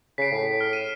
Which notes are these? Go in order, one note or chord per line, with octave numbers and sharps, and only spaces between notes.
C#3 B6 C7 D7
A2
F6
D#7 E7